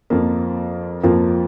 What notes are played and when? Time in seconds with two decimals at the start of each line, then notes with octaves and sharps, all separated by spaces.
0.10 F2 F3 A#3 F4
1.03 F2 F3 A#3 F4